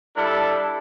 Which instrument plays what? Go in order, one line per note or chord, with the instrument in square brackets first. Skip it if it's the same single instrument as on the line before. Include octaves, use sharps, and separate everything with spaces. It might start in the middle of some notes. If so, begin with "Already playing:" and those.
[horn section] G3 D4 E4 A4